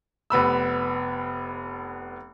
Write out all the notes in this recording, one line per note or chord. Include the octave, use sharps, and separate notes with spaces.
F1 B3 B5 E6